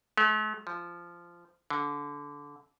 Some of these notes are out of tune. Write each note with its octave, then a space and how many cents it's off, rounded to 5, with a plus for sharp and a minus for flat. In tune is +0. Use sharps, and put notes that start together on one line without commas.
A3 -45
F3 -15
D3 -20